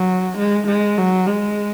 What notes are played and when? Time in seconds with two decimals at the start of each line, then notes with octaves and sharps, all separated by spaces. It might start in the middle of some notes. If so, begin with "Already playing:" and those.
Already playing: F#3
0.38 G#3
0.68 G#3
0.98 F#3
1.27 G#3